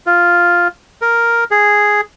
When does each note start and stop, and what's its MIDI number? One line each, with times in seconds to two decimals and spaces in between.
0.07 0.68 65
1.02 1.44 70
1.51 2.01 68